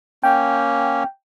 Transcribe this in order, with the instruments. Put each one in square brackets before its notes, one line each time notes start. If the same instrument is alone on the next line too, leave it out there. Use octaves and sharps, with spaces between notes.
[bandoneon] A#3 C#4 [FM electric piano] G5